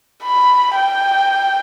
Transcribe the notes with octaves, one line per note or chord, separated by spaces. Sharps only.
B5
G5